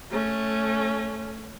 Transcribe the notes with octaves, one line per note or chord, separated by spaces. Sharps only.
A3 C#4